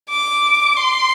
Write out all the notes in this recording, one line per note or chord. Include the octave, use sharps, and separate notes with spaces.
D6
C6